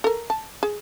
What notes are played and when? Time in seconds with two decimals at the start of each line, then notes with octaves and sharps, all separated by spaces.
0.04 A4 A#4
0.30 A5
0.63 G#4